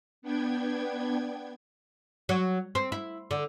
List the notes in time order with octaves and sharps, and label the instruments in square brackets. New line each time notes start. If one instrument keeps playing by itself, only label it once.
[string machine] B3 D4 G5 G#6
[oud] F#3
C4
E4
D3